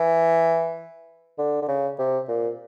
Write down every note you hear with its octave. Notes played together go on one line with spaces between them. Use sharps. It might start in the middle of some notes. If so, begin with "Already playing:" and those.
Already playing: E3
D3
D3
C#3
C3
A#2